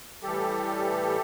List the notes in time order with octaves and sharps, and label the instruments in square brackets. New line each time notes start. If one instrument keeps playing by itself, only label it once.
[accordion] A2 E3 G3 G4 A4